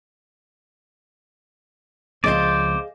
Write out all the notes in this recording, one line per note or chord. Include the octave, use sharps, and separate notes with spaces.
C#2 F3 C4 G#4 C5 D5 D#5 F5